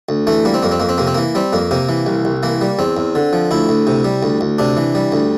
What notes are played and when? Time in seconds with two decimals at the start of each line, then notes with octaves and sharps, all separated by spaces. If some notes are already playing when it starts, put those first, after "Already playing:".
0.09 D2
0.27 E3 A3
0.45 G3 A#3
0.54 C4
0.63 F2 A#3
0.71 C4
0.80 F2 A#3
0.89 C4
0.98 C3 A#3
1.07 C4
1.15 E3 A#3
1.35 G3 C4
1.53 F2 A#3
1.71 C3 A#3
1.89 E3
2.06 C2
2.25 C2
2.43 E3 A#3
2.61 G3
2.79 E2 C4
2.97 E2
3.15 D3
3.33 F3
3.51 D2 E4
3.69 D2
3.87 C3
4.05 G3
4.23 D2
4.41 D2
4.58 C3 D4
4.77 E3
4.95 G3
5.12 D2